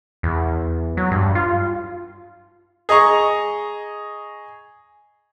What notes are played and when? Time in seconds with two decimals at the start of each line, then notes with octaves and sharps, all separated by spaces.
0.23 E2
0.97 F#3
1.12 G2
1.35 F4
2.89 G#4 D#5 A#5 C#6